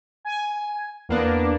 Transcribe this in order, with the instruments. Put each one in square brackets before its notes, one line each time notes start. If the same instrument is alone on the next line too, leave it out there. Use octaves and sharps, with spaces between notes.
[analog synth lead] G#5
[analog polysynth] E2 A#3 D4 [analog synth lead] B3